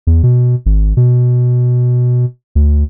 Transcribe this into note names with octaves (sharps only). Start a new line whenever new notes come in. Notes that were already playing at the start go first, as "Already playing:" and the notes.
E2
B2
G#1
B2
D2